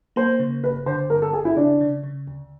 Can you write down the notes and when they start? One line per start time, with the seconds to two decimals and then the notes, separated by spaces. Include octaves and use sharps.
0.16 A#3 C5
0.39 C#3
0.64 G1 B4
0.86 D3 C5
1.10 G2 A#4
1.22 A4
1.33 G1 G#4
1.45 E4
1.57 C#3 D4
1.81 C#3
2.04 C#3
2.27 D2